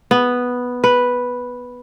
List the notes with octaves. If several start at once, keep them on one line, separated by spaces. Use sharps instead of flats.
B3
B4